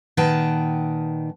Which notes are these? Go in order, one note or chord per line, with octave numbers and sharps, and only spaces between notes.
A#2 D#3 B4 F#5 G5 A5